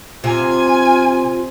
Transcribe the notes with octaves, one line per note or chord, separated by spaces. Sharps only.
C3 F4 G#5